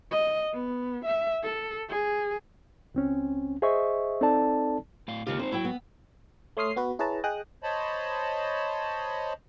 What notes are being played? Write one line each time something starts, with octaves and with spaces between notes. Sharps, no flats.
D#5
B3
E5
A4
G#4
C#2 C4 C#4
G#4 C5 D#5 E5 C#6
C4 D#4 A4 D5 A5
A2 F5
D#2 C#3 D#4 F4 G4
C4 D#4 C5
F#3 E4 G5
B3
A3 C#5 C6 D#6 F6 C7
B3 F#4 B4
E4 G#4 B4 C#5 A5 A#5
G#4 D#5 G5 D#6 F#6
C5 C#5 D#5 A5 B5